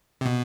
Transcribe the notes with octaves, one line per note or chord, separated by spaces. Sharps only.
C3
B2